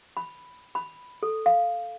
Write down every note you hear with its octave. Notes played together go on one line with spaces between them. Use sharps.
B5
B5
A4
F5